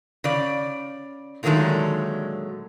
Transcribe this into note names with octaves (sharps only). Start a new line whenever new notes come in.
C#3 D5
A#2 D3 D#3 F#3 G#3 A3